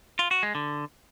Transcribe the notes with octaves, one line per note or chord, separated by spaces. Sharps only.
F4
F#4
G#3
D3